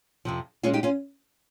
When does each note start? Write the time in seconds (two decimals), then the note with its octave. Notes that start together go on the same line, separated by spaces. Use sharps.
0.25 F2 C3 F3
0.63 A#2 G#3 C#4 F4
0.73 D#4 G4
0.83 C#4 F4